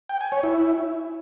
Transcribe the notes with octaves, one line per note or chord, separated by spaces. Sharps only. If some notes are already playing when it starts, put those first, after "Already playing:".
G5
G#5
C#5
E4